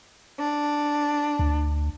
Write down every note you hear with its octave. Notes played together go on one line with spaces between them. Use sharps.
D4
D2